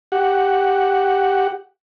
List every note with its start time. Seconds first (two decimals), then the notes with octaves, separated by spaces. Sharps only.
0.12 G4 F#5